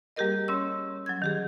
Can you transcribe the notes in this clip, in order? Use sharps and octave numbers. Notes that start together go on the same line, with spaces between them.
G3 A#3 G4 G#4 A#4 D#5
G3 C#4 C#5 C6 E6
F#3 C#4 G#6
D#3 G4 G#4